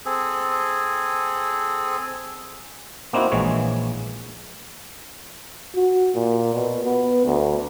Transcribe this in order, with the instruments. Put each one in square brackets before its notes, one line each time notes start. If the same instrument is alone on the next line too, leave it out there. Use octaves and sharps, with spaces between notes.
[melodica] C4 G#4 A4
[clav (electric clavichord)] A#3 C4 D#4 E4 F#4
A#1 E3 G#3 C#5
[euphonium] F#4
A#2
B2
B3
D2